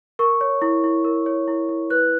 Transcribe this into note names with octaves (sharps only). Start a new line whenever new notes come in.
A#4 C#6
C#5
E4
E4
A#4
C#5
E4
E4
B4 F#6